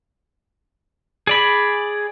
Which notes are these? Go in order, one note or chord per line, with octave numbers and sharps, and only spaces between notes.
G#4 D5 B5